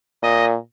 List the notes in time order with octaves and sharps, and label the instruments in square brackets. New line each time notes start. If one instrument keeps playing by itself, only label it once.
[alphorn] A#2 [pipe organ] D#5